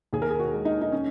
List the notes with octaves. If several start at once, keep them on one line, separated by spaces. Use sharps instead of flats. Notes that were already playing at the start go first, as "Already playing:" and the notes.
D#2 G#4
A#4
G#4
F#4
G#3
D#4
D#4
C#4